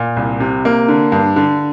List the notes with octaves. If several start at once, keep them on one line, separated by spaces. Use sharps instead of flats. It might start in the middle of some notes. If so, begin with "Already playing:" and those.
Already playing: A#2
C2
C3
A#3
D3
G2
D3